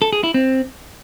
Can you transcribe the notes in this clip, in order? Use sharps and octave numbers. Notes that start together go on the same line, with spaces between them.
A4
G#4
E4
C4